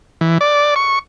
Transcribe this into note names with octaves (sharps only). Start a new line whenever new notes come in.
E3
D5
C#6